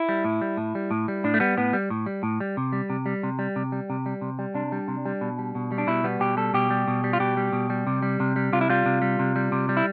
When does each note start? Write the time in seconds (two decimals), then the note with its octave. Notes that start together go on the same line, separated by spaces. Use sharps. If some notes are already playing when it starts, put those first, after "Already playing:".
Already playing: E4
0.09 G3
0.25 A2
0.42 G3
0.57 A2
0.75 G3
0.91 A2
1.08 G3
1.24 A2 D4
1.34 A3
1.40 G3 B3
1.57 A2 B3
1.73 G3
1.90 A2
2.06 G3
2.23 A2
2.40 G3
2.57 C3
2.73 G3
2.90 C3
3.06 G3
3.23 C3
3.39 G3
3.56 C3
3.72 G3
3.90 C3
4.06 G3
4.22 C3
4.39 G3
4.54 C3 D4
4.72 G3
4.88 C3
5.05 G3
5.21 B2
5.39 G3
5.55 B2
5.72 G3
5.78 D4
5.87 B2 E4
6.04 G3 B3
6.20 B2 G4
6.37 G3 A4
6.54 B2 G4
6.71 G3
6.88 B2
7.04 G3
7.13 F4
7.20 B2 G4
7.37 G3
7.53 B2
7.70 G3
7.87 C3
8.03 G3
8.20 C3
8.36 G3
8.53 C3 F4
8.61 E4
8.69 G3 F4
8.86 C3
9.02 G3
9.19 C3
9.36 G3
9.52 C3
9.69 G3
9.77 E4